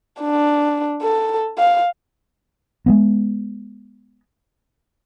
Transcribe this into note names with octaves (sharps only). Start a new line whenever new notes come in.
D4
A4
F5
G#3 A#3 B3